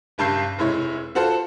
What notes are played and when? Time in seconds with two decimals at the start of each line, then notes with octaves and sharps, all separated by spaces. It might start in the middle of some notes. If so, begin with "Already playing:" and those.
0.18 F#1 G2 A5 G6 C7
0.58 F1 G#3 E4 C#5
1.15 F4 F#4 A4 C5